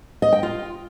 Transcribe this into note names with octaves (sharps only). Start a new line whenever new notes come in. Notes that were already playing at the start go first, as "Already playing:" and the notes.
D#5
G5
F4